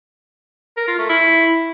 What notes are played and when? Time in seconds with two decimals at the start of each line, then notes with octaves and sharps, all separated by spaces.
0.77 A#4
0.88 F4
0.98 A3
1.09 E4